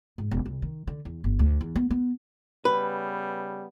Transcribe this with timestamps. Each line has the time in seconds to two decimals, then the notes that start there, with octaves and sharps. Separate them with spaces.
0.18 G#2
0.31 E1
0.46 C2
0.62 D#3
0.87 D3
1.05 E2
1.24 G1
1.39 D2
1.61 E2
1.76 B3
1.91 B3
2.65 C#3 G3 B3 B4